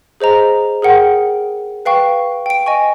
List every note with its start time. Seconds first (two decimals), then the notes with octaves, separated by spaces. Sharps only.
0.21 G#4 C5 D#5 A#5
0.82 G#4 A#4 F#5 G5
1.86 B4 F5 G5 C#6
2.46 G5 D7
2.66 D#5 G#5 C#6